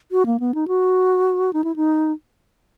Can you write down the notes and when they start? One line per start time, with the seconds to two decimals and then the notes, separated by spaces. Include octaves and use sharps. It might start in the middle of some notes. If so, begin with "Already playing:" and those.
0.12 F#4
0.26 A#3
0.40 B3
0.54 D#4
0.68 F#4
1.53 D#4
1.64 E4
1.76 D#4